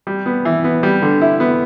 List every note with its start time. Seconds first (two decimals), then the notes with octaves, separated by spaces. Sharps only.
0.07 G3
0.26 B3
0.45 E3
0.64 B3
0.83 G3
1.02 D3
1.21 E4
1.40 B3